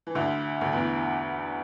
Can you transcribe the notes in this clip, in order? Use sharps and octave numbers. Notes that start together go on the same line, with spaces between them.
E3
D2 D3
D2 D3
E2 E3